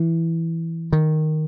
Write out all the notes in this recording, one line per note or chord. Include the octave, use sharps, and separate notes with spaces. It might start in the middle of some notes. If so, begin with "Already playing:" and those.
Already playing: E3
D#3